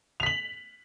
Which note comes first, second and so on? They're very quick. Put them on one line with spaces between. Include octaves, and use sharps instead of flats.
F7 B6 F#7